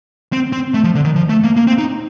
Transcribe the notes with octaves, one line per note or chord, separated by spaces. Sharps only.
C4
C4
A3
F3
D3
D#3
F3
A3
A#3
A#3
C4
D#4